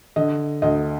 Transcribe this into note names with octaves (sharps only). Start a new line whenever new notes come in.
D3 D#5
D2 D#5